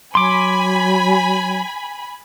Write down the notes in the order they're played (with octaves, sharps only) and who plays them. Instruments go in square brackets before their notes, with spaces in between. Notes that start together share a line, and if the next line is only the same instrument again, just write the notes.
[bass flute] F#3 [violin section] G#5 B5 [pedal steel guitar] C6 D6